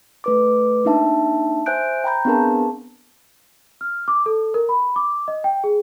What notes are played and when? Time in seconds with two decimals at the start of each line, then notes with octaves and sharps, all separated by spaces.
0.24 A3 B4 D6
0.85 A#3 D4 D#4 E5 A5
1.66 C5 E5 G#5 F#6 G6 D7
2.04 G5 A#5 B5 G6
2.25 B3 C4 D4 G#4 A#4 A5
3.81 F6
4.08 D6
4.26 A4
4.54 A#4
4.69 B5
4.96 D6
5.28 D#5
5.44 G5
5.64 G#4